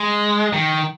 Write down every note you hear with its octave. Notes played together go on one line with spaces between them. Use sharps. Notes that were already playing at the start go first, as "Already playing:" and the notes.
Already playing: G#3
D#3